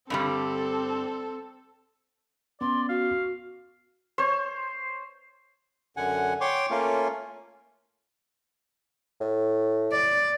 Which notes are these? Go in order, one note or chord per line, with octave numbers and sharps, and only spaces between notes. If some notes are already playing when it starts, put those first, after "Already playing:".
G2 D3 G3 C4 A4
B3 C#4 D5 C6
F#4 F5
C5 C#5
F#2 D3 F#5 G#5
C#5 G5 C6 D6
A3 A#3 C#4 F4
A2
D5